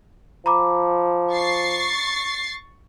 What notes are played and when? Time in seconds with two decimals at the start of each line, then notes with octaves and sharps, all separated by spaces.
0.46 F3 A#5 B5 D6
1.32 C#6 A6 C7